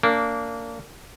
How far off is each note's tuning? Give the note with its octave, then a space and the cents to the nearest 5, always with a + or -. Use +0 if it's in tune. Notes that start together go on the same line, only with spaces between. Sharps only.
A#3 -20 D4 -25